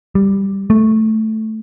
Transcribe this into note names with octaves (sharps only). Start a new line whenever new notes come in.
G3
A3